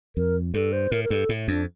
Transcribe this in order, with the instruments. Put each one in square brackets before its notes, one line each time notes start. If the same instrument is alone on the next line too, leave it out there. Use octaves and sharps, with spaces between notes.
[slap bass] F2 [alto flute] A#4
[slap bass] G2 [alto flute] A4
[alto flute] C5
[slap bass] A2 [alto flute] A#4
[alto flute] A#4
[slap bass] G2 [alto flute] A4
[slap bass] A2
[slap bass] F2 [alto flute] D4